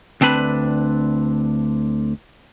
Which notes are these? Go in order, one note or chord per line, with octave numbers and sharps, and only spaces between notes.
D2 C4 D4 B4 B5